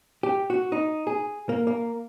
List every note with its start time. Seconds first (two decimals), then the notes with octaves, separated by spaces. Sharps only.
0.23 G4
0.50 F#4
0.72 D#4
1.07 G#4
1.49 A#3
1.67 A#3